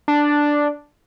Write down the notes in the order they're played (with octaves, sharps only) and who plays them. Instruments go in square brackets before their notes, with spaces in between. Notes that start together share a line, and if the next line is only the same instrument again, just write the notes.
[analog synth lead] D4